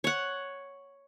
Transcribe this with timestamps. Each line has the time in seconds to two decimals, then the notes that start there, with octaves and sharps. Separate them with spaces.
0.04 C#5 F#5